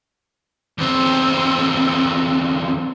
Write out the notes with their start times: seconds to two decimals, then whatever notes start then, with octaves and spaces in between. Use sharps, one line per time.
0.78 E2 C4